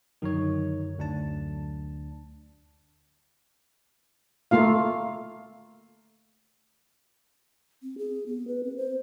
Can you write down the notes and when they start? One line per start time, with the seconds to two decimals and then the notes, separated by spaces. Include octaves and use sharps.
0.22 F#2 D3 D#3 F#3 D#4 C#5
0.99 D2 D4 A5
4.51 A3 A#3 F4 F5
7.82 C4
7.98 G#4
8.26 B3
8.47 B4
8.63 C4
8.77 C5